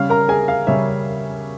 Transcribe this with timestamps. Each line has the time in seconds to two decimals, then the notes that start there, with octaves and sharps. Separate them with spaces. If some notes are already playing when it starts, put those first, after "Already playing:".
Already playing: C#3 G3 C#4 F5 F6
0.10 A#4 A#5
0.29 G#4 G#5
0.48 F5
0.67 C#3 G3 C#4 E5